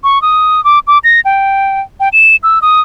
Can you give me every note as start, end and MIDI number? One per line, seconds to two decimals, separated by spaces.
0.04 0.21 85
0.22 0.63 87
0.64 0.79 86
0.87 0.98 86
1.04 1.20 94
1.25 1.81 79
2.00 2.09 79
2.13 2.36 100
2.43 2.59 88
2.62 2.81 87